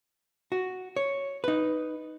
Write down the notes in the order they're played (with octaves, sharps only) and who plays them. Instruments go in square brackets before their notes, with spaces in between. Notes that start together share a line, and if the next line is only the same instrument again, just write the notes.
[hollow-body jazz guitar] F#4
C#5
D#4 B4